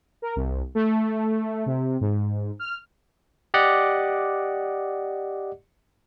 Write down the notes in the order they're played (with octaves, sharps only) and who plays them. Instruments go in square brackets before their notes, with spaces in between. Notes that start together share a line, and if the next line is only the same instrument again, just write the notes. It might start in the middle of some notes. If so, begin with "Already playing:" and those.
[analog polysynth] A#4
C2
A3
C3
G#2
F6
[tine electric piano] G4 D5 D#5 F#5